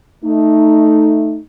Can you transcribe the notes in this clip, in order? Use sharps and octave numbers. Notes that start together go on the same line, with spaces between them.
A3 D#4